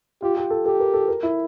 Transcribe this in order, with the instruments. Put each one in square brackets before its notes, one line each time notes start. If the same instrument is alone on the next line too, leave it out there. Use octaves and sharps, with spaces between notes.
[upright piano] F4 [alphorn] G4
[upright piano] G4
A4
[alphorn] G4 [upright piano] A4
[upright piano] A#4
A4
A#4
E4